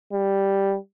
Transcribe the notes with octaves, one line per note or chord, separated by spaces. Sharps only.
G3